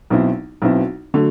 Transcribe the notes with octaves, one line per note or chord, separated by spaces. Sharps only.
B1 B2 F#3 C4 E4
B1 B2 F#3 C4 E4
D3 F#3 A3